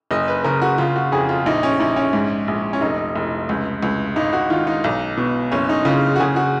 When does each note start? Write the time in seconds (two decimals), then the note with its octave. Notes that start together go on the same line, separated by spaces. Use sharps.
0.11 F#1 D#5
0.28 B4
0.44 C#3 A#4
0.62 F#4
0.78 C#3 F4
0.96 F#4
1.12 F2 G#4
1.29 F4
1.46 A#1 D#4
1.63 C#4
1.80 A#1 D#4
1.96 C#4
2.13 G#2
2.48 A#1
2.73 C#4
2.81 F1 D#4
3.15 F1
3.49 C#2
3.83 C#2
4.16 G#1 D#4
4.33 F#4
4.50 D#3 F4
4.67 D#4
4.84 B1 D#4
5.17 B2
5.52 F#1 C#4
5.69 D#4
5.85 C#3 F4
6.16 F#4
6.20 C#3 G#4
6.36 F#4